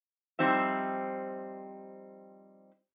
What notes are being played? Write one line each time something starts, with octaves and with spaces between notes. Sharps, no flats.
F3 G3 C4 D#4 E5